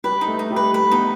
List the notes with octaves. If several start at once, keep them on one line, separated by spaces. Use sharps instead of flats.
G3 G4 B4
D#4
A3 A4
D#4
G3 G4
B4
A3 B4
B3 D#4